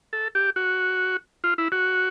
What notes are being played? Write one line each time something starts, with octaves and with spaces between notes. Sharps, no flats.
A4
G4
F#4
F4
E4
F#4